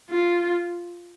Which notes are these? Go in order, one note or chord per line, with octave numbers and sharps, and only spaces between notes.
F4